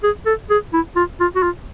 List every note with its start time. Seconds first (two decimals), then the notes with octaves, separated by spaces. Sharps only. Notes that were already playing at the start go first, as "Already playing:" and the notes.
0.03 G#4
0.26 A4
0.50 G#4
0.73 E4
0.96 F4
1.20 F4
1.36 F#4
1.43 F4